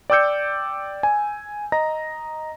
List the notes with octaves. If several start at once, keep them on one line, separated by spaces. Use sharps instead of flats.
D5 G5 D6 E6 G6 C#7
G#5
D#5 A#5 A#6